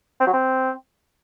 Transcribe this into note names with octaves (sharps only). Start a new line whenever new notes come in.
C4
F#3
C4